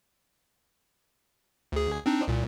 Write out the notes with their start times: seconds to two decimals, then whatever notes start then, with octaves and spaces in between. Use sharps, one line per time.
1.72 D2 G#4
2.06 C4 D4 D#4
2.28 C2 A#2